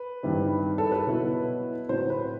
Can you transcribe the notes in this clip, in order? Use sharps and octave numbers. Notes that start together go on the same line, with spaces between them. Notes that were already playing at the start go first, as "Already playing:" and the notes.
Already playing: B4
G2 D#3 G3 C4 E4
A4
B4
B2 F#3 B3 E4
A2 F#3 C4 C5
B4